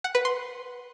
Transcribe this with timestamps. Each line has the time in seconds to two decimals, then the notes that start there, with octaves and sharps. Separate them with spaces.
0.04 F#5
0.15 B4
0.25 C6